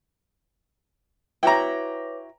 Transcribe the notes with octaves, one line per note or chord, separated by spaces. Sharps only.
E4 F#4 B4 C#5 E5 G5 A#5 D6